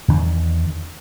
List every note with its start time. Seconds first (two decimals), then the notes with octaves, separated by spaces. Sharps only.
0.08 E2 D#3 D4